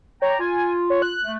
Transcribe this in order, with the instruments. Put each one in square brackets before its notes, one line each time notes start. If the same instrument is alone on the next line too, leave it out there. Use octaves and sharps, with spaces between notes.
[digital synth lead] C#5 [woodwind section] D5 G5 A#5
[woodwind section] F4 [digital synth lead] G#5
[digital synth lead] C#5
F#6
[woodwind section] A3